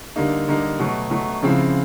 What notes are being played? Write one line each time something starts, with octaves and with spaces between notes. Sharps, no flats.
D3 G3 A#3 D#4
D3 G3 A#3 D#4
B2 F#3 A3
B2 F#3 A3
C#3 F3 G#3 C4 E4